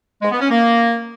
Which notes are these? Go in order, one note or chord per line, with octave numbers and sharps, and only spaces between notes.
G#3
B3
C#4
A#3